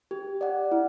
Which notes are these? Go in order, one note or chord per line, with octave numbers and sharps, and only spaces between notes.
G4
D5 F#5
E4